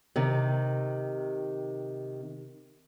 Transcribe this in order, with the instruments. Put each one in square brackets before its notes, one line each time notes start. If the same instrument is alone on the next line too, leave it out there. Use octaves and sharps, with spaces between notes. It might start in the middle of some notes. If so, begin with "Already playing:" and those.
[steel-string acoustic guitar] C3 D#3